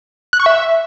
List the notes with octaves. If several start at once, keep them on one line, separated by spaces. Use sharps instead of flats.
F#6
C#6
E5